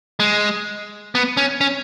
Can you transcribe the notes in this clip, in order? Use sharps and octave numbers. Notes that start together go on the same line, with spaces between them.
G#3
B3
C#4
C#4